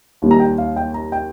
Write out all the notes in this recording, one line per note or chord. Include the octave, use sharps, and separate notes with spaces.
D#2 D#3 G3
A#5
G5
F5
G5
A#5
G5